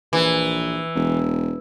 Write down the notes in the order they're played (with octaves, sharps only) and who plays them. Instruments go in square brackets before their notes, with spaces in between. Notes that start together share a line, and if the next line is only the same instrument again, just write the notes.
[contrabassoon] A#1 [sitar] E3
[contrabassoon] E1